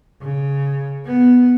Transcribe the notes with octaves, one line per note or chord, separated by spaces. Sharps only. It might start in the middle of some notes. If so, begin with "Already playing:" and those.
C#3
B3